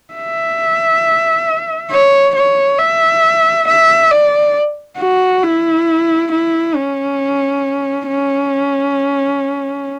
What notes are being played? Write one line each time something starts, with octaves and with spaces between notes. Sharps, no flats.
E5
C#5
C#5
E5
E5
D5
F#4
E4
E4
C#4
C#4